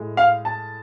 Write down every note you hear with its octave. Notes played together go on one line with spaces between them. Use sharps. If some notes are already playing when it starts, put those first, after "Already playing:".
Already playing: A2 G#3
F5
A5